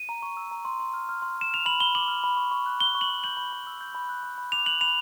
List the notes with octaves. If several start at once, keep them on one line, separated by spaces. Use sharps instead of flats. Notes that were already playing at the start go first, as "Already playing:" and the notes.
Already playing: D#7
A#5
C#6
E6
A#5
C6
C6
F6
F6
C6
C6 E7
F6 F7
B5 F#7
B5 G7
D6 F#7
F6
B5
C#6
C#6
F#6
F#6 G7
C#6
F#7
C#6
G6 F#7
B5
B5
E6
G6
B5
F#6
B5
B5
D6 F7
F#6 F#7
B5 F7